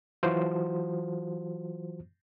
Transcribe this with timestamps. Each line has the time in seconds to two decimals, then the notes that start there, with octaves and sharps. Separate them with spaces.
0.23 E3 F#3 F4 F#4 C5